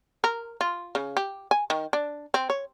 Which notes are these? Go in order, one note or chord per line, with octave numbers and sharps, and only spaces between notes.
A#4
F4
C#3
G4
G#5
D#3
D4
C4
C#5